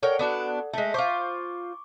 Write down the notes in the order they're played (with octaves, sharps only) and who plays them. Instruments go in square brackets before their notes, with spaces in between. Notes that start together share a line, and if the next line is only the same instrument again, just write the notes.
[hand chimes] A4 D5 F#5 [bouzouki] A#4 C#5 G5
[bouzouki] B3 D4 F#4
[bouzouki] G#3 A3 [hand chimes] E5 B6
[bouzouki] F4 C5 [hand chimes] C#6 D6